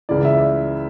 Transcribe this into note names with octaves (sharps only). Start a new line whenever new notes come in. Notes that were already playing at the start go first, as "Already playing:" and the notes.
C#2 C#3 E3 D5
E5
D5